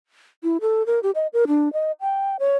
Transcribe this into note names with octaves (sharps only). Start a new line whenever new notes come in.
E4
A4
A#4
G4
D#5
A#4
D4
D#5
G5
C#5